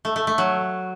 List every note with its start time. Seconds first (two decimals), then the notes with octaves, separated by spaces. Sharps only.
0.05 A3
0.16 A3
0.27 A3
0.38 F#3